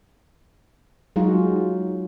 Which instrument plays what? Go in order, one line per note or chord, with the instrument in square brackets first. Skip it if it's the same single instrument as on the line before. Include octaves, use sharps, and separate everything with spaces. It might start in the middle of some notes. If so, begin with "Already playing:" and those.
[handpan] F#3 G#3 D#4 F4 F#4